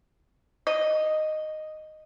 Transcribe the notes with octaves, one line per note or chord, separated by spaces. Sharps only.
D#5